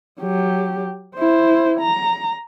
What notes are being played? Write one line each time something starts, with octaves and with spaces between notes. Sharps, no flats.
F#3 G4
E4 C5
A#5